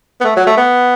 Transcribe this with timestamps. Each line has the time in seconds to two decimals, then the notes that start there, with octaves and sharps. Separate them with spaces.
0.21 B3
0.25 A3
0.36 F#3
0.46 A3
0.57 B3